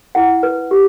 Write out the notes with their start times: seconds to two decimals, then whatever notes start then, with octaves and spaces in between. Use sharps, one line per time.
0.15 E4 F#5
0.43 B4
0.71 G4